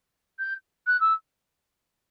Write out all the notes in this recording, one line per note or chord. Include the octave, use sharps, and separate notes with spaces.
G6
F#6
E6